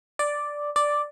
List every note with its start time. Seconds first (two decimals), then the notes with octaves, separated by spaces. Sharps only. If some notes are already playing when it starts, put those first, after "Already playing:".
0.19 D5
0.76 D5